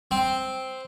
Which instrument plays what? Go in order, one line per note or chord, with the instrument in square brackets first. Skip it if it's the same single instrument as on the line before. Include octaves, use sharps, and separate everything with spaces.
[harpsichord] C4